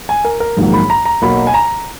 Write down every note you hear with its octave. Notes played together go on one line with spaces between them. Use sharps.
G#5
A#4
A#4
A#1 G#2 D#3 F#3 A#3
B5
A#5
A#5
B1 B2 F#3 A#3 B5
G#5
A#5